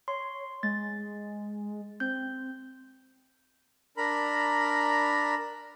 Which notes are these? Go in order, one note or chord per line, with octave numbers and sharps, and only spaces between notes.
C#5 C6
G#3 A6
C4 G6
D4 A#4 A#5 B5